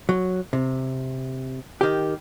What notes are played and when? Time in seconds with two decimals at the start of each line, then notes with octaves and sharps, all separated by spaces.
0.09 F#3
0.53 C3
1.81 D#3 G4